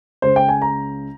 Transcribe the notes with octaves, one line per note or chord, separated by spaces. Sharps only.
C#2 C#3 G#3 C5
G5
G#5
A#5